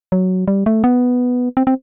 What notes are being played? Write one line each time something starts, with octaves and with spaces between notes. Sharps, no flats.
F#3
G3
A3
B3
C4
C4